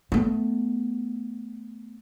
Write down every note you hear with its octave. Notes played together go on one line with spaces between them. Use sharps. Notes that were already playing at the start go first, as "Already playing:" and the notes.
A3 B3